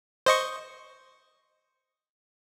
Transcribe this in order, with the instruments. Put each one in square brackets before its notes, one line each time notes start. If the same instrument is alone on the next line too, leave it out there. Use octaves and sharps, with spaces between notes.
[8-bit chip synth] C5 D#5 C#6